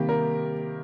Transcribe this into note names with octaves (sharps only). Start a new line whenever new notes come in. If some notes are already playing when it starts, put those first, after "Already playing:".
Already playing: C3 D#3 G3 A#3 G4
A#4